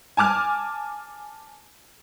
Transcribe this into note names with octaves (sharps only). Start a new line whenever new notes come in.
G#5 A5 D6 F6